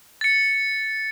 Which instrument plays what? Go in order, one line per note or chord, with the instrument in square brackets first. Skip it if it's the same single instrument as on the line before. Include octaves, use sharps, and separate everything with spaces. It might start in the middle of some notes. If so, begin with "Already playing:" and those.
[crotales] A6 C#7